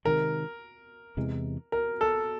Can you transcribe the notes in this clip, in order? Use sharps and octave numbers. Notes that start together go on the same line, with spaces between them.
C3 D#3 G#3 A#4
E2 C3 E3 G#3
A#4
A4